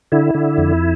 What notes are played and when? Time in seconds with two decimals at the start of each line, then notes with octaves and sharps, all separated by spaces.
0.12 D3 E4
0.35 D3
0.58 F2